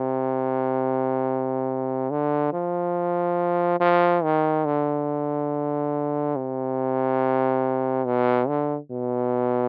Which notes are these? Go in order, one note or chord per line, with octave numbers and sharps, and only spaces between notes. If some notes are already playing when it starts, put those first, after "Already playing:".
Already playing: C3
D3
F3
F3
D#3
D3
C3
B2
D3
B2